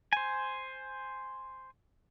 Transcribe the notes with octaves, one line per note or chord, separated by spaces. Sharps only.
C5 G#5